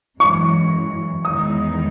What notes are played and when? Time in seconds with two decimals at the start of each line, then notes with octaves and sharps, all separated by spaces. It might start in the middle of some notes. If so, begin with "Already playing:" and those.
0.20 F#2 E3 G#3 C#6
1.25 E2 D#3 G#3 D#4 D#6